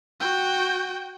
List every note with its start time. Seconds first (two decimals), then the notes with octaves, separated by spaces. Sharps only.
0.21 F#4 G5